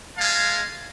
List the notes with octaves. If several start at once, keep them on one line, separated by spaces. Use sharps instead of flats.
G#3 F5 G#5 A5